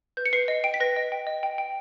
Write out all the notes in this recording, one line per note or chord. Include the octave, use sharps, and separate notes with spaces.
B4 G6
C#7
B4 C7
D#5
G5 D7
B6
B4 A#6
D#5
G5
D#5
G5
G5